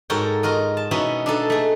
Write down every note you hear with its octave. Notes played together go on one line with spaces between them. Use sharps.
G#2 F#4 A4 A#4 C#5 G5
F4 F#4 A#4 D#5
A5
B2 C#4 D#4 E4 F#4 B4
D4 D#4 A4 B4
A3 G#4